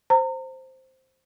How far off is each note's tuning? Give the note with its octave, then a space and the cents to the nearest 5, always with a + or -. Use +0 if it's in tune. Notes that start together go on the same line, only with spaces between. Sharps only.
C5 +0 A#5 -35